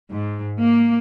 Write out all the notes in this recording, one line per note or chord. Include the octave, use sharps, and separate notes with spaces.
G#2
A#3